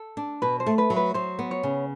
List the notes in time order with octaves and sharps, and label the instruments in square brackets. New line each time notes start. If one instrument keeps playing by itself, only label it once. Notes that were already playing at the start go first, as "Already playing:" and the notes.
Already playing: [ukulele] A4
[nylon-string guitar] D4
[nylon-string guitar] B2 [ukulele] B4
[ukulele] C5
[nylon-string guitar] A3
[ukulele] B4
[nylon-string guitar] F#3
[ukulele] B4
[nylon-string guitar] F#3 [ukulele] C5
[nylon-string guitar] B3
[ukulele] C#5
[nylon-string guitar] C#3